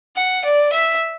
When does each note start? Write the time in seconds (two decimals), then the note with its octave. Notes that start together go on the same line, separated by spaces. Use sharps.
0.16 F#5
0.45 D5
0.73 E5